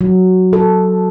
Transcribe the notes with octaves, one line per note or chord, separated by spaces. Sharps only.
F#3
A4